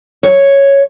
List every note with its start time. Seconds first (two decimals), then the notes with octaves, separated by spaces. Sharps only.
0.23 C#5